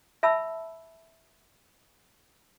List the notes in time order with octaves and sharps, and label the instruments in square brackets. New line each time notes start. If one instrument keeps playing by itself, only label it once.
[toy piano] E5 A5 B5 E6